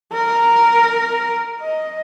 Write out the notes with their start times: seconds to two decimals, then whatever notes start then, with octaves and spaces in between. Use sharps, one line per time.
0.13 A#4
1.61 D#5